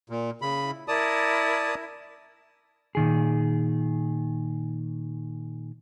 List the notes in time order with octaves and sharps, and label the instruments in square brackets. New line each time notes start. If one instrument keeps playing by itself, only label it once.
[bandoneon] A#2
C#3 B5
[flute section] E4
[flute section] E4 A#4 G#6 [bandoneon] D5 A5 D#6
[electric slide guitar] A#2 D#3 G#4